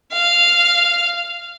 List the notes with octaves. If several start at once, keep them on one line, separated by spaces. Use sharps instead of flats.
F5